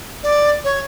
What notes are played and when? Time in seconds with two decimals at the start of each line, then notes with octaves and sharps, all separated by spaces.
0.23 D5
0.64 C#5